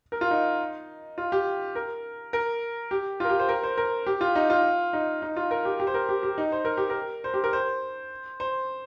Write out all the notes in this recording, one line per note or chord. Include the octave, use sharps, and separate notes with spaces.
A#4
F4
D#4
F4
G4
A#4
A#4
G4
F4 A#4
G4
C5
A#4
C5
A#4
G4
F4
D#4
F4
D#4
D#4
F4
A#4
G4
G4
C5
A#4
G4
G4
D#4
C5
A#4
G4
A#4
C5
G4
A#4
C5
C5